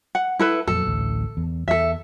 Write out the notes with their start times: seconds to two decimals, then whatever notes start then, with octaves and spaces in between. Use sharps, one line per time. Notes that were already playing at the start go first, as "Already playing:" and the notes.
0.15 F#5
0.39 E4 A4 B4
0.67 F2 A#2 F#3 A4
0.86 A1 D2 A2
1.37 E2
1.68 E2 A4 E5